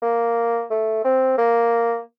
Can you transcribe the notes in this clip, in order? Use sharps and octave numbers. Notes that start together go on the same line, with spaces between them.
A#3
A3
C4
A#3